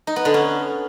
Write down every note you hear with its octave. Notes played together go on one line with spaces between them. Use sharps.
D#4
B3
D3
C#4